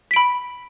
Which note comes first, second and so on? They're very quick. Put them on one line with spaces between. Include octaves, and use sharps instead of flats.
B6 D7 B5